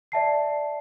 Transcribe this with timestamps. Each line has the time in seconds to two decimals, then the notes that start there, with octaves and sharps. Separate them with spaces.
0.12 D5 E5 A5 C7